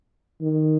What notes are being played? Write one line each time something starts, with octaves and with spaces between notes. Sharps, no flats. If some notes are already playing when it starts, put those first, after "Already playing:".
D#3